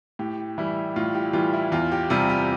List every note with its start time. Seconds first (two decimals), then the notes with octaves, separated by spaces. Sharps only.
0.19 A2 G4
0.58 E3 G3 E4
0.96 A2 F4
1.15 G4
1.33 E3 G3 F4
1.53 E4
1.72 E2 F4
1.92 G4
2.10 C3 G3 F4
2.30 G4